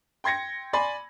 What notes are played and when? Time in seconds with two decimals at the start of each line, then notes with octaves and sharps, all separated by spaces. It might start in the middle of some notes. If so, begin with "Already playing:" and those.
0.24 G5 C6 G#6 A#6 C#7
0.73 D5 G#5 B5 C6